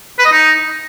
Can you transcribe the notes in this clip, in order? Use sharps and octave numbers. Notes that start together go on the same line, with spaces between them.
B4
D#5
D#4